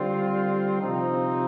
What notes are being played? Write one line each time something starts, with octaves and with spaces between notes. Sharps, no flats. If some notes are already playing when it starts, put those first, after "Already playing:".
Already playing: D3 G3 C4 F4
C3 F3 C4 D#4